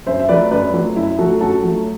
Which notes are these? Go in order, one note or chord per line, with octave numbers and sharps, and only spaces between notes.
F#2 C5 E5
E5
F#3 A3 B4 D5
F#2 B4 D5
F#3 A3
F#2 E4
F#3 A3 F#4 A4
F#2 F#4 A4
F#3 A3